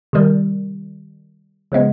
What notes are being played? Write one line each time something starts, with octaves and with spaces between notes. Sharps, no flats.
C3 D#3 G3
C#3 F3 G#3 B3